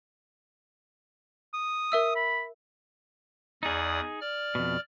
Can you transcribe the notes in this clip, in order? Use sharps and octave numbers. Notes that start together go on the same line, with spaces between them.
D#6
A#4 E5 E6
B5
E2 D#4 G#4 D5 D#6
D5 F6
F2 B2